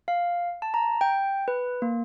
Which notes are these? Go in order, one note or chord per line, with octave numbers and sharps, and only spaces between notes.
F5
A5
A#5
G5
B4
A#3